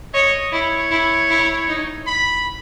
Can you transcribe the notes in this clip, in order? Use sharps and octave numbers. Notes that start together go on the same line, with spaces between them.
C#5 D#5
E4 C#5
E4
E4
D#4
B5